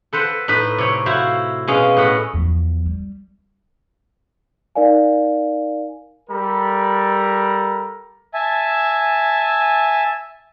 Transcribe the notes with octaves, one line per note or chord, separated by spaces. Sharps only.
A4 B4 C5 F#5
A2 D#4 B4 B5
C3 C#5
E4 F#4 C5 F5
B2 G#3 C#4 G#4 F5
A2 D#5 F#5 B5
E2 F3
G3
D#4 A#4 D5 F5 G#5
G3 A4 A#4 A#5 B5
E5 G#5 A5